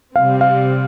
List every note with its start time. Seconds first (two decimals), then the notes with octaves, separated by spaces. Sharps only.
0.15 C3 G3 C4 F5
0.41 F5